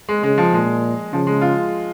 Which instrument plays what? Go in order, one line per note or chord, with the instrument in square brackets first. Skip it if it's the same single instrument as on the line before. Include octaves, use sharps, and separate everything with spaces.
[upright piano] G#3
[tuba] C#3 [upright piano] G#3
[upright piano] F3
[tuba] A#2 [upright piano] G#3
[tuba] C#3 [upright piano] F3
[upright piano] G#3
F4